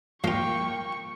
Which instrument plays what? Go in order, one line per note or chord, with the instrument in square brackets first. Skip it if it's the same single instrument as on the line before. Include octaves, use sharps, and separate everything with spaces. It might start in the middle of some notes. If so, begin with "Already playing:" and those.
[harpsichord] F3 F4 [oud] A#3 [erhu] G5 [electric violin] C#6